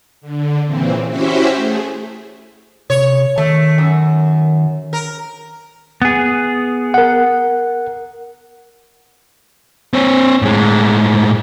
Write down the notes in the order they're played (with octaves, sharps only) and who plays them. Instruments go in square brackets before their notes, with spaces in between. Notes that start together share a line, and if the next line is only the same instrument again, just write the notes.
[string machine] D3
A#2 C#3 E3 C4
C#4 E4 F#4 G4 C5 E5
A3 G#4
[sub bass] C3 [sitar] C#5
[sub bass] D#3 [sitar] A3
[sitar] F#2
A#4
[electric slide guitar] B3 G#4
[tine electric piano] A#4 F#5
[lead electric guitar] C4 C#5
A2 G#3